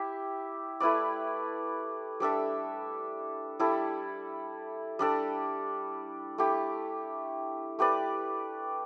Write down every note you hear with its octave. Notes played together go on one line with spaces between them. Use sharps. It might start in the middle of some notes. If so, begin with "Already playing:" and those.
Already playing: E4 G4 E5
A3 E4 B4 D5
G3 D4 A4 E5
G3 E4 A4
G3 D4 A4 D5
A3 E4 G4
A3 G4 B4 D5